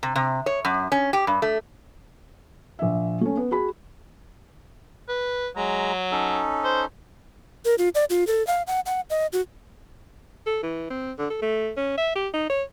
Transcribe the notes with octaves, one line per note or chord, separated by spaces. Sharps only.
C3
C3
C#5
F#2
C#4
G4
G2
A3
A#1 E5
A3 C#4
B3
F#4 G#4 B5
B4
F#3 G#3 A#5
C#4 D#4 A4
C5
A#4
F4
D5
F4
A4
F5
F#5
F#5
D#5
F#4
A4
E3
C4
D3
A4
A3
C#4
E5
G4
D#4
C#5